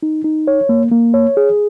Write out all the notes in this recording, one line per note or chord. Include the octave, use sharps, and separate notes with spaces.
D#4
D#4
C#5
A#3
A#3
C#5
G#4